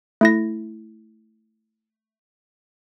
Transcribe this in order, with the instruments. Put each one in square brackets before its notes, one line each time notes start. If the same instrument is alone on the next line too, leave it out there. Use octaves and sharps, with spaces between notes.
[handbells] A3 E4 A#6